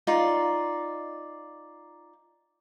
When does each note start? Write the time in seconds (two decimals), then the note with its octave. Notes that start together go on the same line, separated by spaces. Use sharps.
0.07 D#4 F4 D5